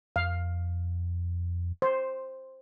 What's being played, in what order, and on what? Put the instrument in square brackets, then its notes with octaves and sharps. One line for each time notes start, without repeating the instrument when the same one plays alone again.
[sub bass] F2 [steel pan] F5
[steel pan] C5